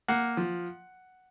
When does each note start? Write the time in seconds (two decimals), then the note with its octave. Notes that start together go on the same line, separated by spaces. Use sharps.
0.08 A#3 F#5
0.37 F3